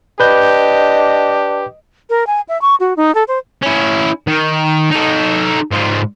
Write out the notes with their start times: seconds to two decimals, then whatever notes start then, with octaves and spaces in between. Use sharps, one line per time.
0.20 D4 G4 B4 D#5 G6
2.10 A#4
2.27 G#5
2.48 E5
2.61 C#6
2.80 F#4
2.97 D#4
3.15 A4
3.28 C5
3.62 C#4 E4
4.27 D#3
4.91 D#4 A4
5.71 G#2 F4